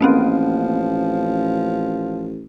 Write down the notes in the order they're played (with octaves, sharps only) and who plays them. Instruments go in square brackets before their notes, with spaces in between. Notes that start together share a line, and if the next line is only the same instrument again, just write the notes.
[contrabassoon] A1 [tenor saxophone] F3 [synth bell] A#3 C4 C#4